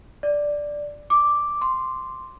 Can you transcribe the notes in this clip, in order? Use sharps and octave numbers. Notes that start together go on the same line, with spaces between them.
D5
D6
C6